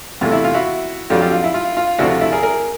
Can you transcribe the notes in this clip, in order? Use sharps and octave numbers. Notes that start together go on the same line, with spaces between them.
E2 C3 E3 A3 F4
E4
F4
E4 F#4
F2 D3 F#3 F4 G4
F4 G4
F4
E4
F4
F4
D2 C3 F3 A3 D4 E4 F#4
F4
E4
G#4 A#4
G#4 A#4